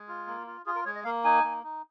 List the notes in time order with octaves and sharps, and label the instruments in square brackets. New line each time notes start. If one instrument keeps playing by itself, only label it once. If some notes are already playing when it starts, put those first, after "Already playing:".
Already playing: [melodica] G#3
F4
A#3
F4
F4 G#4
A#4
G#3 C#5
D#5
A#3 F5
D#4 G#5
A#3
D#4